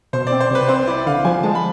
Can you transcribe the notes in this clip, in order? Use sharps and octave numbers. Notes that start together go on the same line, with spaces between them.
B2 C5
C4 D5
C5
C2 B4
C4 C5
E4 D5
D3 F5
F3 G#5
G#3 A5
B5